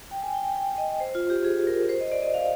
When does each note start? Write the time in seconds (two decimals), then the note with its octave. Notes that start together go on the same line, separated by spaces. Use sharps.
0.11 G5
0.22 G#5
0.34 G5
0.45 G5
0.56 G5
0.78 D#5
1.00 C5
1.15 F4
1.30 G4
1.44 G#4
1.67 A#4
1.89 C5
2.01 D#5
2.12 D5
2.22 D#5
2.34 F5